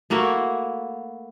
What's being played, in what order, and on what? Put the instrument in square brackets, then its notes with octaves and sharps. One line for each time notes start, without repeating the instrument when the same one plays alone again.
[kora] A3 A#3 E4 F#4